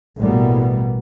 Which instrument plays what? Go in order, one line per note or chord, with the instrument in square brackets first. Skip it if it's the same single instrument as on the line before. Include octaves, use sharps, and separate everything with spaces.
[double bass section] A1 B2 G3 A#3 B3